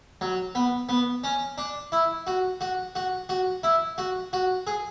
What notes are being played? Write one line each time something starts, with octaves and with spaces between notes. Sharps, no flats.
F#3
B3
B3
C#4
D4
E4
F#4
F#4
F#4
F#4
E4
F#4
F#4
G#4